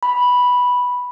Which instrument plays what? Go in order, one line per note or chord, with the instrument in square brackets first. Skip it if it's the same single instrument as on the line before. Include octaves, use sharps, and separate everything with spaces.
[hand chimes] B5